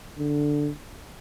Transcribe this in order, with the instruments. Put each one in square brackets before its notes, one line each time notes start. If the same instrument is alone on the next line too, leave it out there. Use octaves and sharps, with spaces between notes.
[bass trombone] D3